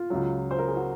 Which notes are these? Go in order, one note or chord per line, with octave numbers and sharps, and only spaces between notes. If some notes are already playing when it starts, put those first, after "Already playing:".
Already playing: F4
C#2 C#3 F#3
C5
A#4
G#4
F#4